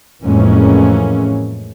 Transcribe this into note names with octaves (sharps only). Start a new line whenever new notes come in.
F2 A2 E3 G#3 A#3 C#4